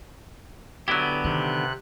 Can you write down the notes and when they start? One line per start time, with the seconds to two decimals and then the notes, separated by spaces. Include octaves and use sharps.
0.88 D3 F#3 B3 E4 G4
1.24 C3 D#3 F#6